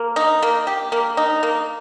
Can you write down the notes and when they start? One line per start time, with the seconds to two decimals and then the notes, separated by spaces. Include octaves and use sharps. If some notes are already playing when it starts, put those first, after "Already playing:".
Already playing: A#3
0.16 D#4
0.42 A#3
0.67 G4
0.92 A#3
1.17 D#4
1.43 A#3